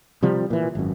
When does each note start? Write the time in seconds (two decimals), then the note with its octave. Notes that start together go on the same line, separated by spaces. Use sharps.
0.23 C3 F3 G3
0.50 A#2 E3
0.75 G#1 F#2